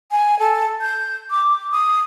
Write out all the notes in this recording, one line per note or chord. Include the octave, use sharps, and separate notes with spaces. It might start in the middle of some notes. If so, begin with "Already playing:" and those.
G#5
A4
G6
D6
D#6